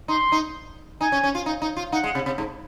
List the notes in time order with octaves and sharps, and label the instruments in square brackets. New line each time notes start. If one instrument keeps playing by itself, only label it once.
[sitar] D#4 [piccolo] C6
[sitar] D#4
[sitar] D#4 [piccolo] G#5
[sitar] C#4
C#4
F4
D#4
D#4
F4
[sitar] D#4 [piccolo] F#5
[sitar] G#3
C3
C3
G#2